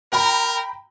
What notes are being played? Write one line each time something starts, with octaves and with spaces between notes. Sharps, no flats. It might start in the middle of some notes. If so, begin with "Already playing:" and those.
A#4 G5 A#5 B5